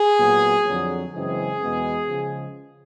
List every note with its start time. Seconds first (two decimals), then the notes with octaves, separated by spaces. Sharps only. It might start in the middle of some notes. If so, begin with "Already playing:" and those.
Already playing: G#4
0.18 A#2 F#3 B3
0.66 F2 D3 F#3
1.13 F#2 C#3 E3 G#3 C4 G#4
1.61 E2 B2 G#3 B3
2.09 C#3 F3 G#3